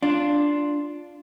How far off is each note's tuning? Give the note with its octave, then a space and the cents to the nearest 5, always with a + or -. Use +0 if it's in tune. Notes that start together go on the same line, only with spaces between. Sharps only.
D4 +0 F4 +0